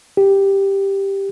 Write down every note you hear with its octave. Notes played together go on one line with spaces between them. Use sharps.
G4